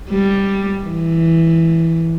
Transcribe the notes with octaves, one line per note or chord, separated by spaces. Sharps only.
G3
E3